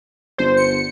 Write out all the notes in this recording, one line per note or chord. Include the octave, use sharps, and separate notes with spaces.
G1 C5
C#7